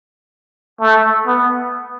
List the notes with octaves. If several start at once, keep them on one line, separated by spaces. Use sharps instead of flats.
A3
B3